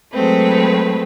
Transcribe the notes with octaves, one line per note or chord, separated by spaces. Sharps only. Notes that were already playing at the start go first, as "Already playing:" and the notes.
F#3 G#3 A3 C4 B4